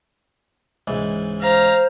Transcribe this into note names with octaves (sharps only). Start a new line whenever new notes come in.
C#2 G#2 E3
C5 F5 A#5